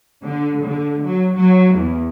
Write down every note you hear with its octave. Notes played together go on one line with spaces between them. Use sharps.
D3
D3
F#3
F#3
E2